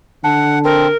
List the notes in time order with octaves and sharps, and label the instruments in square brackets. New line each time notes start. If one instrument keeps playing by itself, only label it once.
[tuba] D3 [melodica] F#5 [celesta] A5
[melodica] C4 [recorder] A#4